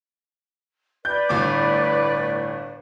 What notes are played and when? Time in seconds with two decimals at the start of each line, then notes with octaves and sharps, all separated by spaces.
1.05 B4 D5 G6
1.29 G1 A2 D6